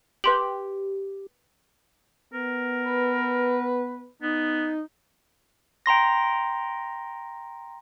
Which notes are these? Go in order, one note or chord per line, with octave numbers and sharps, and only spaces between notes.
G4 B4 C6 F#7
B3 A#4
B4
B3 D#4
G5 A#5 C6 A#6